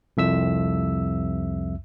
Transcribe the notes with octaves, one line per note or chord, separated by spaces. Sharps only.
C2 F2 E5 E6